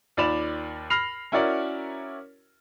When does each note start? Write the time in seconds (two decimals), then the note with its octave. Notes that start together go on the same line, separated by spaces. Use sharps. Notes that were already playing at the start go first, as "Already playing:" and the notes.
0.17 D#2 F4 D5 B5 E7 F7
0.90 B5 F6 A#6 C7 F7
1.32 C#4 E4 F#4 A#4 C#5 D5